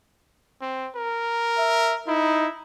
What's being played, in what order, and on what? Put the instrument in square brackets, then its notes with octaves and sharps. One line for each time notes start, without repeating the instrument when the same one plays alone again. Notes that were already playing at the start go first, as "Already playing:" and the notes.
[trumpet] C4
A#4
[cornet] E5
[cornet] D#4 [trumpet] E4